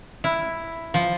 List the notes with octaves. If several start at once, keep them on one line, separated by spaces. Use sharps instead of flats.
E4
F3